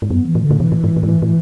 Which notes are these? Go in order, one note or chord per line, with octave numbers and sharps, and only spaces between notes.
G#2
F#2 B3
E3
A2
D3
A2
B2 E3
A2
G#2
A2
G#2
A2
A2